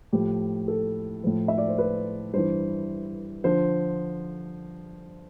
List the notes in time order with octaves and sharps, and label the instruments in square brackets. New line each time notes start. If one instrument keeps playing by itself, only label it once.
[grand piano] A2 F3 G4
A4
A2 F3
E5
D5
C5
B4
G2 E3 C5
D3 F3 C5